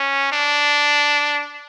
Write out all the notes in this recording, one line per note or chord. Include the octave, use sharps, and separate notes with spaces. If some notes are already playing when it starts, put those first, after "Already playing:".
Already playing: C#4
D4